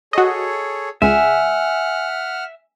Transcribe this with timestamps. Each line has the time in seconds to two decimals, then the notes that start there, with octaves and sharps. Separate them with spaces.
0.13 F#4 G#4 A4 C#5 D#5
1.02 C#2 G#3 E5 F#5 G#5 F6